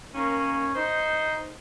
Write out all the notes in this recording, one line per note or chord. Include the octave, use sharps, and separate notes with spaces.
D#3 A#3 C#4
D#4 C5